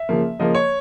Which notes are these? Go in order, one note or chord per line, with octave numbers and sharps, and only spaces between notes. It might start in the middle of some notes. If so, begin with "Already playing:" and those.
Already playing: E5
C#3 F3 A#3
C#3 F3 A#3 D#5
C#5